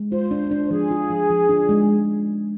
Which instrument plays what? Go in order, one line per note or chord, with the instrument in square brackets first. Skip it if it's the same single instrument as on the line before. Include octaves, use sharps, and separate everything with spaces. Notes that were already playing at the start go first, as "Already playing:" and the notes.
Already playing: [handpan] G#3
[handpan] F4 [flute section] C5
[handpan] D4
D4
[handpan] F3 [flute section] G#4
[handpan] F4
F3
F3
D4
G#3